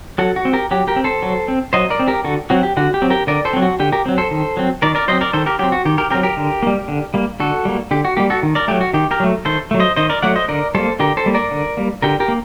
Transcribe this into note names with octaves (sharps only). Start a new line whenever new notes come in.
F#3 F#4 A4
F#4
C4
G4 A#4
F#3 G4
G4 A#4
C4
A4 C5
F#3
C4
F#3 C5 D#5
A#4 D5
C4
G4 A#4
D3 F#4 A4
F#3 C4 F#4
G4
D3 F#4
G4
F#3 C4
G4 A#4
D3 A#4 D5
A4 C5
F#3 C4
F#4
D3 G4
G4 A#4
F#3 C4
A4 C5
D#3
F#3 C4
D#3 A#4 D5
A#4 D5
F#3 C4 C5 D#5
A#4 D5
D#3 A4 C5
G4 A#4
F#3 C4 G4
F#4
D#3 G4
G4 A#4
F#3 C4 G4 A#4
G4 A#4
D3
G3 A#3
D3
G3 A#3
D3 F#4 A4
G3 A#3
D3 G4
F#4
G3 A#3 G4
F#4 A4
D#3
A#4 D5
F#3 A3 G4
F#4
D#3 G4
G4 A#4
F#3 A3
D#3 A4 C5
F#3 A3
C5 D#5
D#3 C5 D#5
A#4 D5
F#3 A3 D5 F#5
C5 D#5
D3 A#4 D5
G3 A#3 A4 C5
D3 G4 A#4
A4 C5
G3 A#3
A#4 D5
D3
G3 A#3
D3 G4 A#4
G4 A#4
A#3